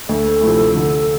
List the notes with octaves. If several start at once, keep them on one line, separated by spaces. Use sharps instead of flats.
D2 A4
C3 F3 A3 E4
D3